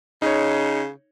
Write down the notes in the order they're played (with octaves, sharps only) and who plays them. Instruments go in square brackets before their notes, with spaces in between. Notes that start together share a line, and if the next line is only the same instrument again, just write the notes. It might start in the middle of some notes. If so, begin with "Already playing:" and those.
[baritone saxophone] C#3 [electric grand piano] D#4 C#5